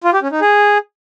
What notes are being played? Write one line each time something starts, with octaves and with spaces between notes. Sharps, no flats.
F4
G4
C#4
D#4
G#4